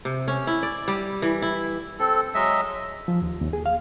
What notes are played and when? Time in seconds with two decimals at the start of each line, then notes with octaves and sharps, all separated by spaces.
0.05 C3
0.28 C#4
0.47 E4
0.63 D5
0.88 G3
1.22 E3
1.42 E4
1.99 C4 A4
2.35 F#3 G#3 D#5 E5
3.08 F3
3.22 D#2
3.41 D#2
3.53 G#4
3.66 F5